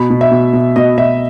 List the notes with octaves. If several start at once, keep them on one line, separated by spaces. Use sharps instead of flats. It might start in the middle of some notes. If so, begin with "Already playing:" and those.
Already playing: B2 B5
B2
E5
B2
B2
B2 D#5
B2 E5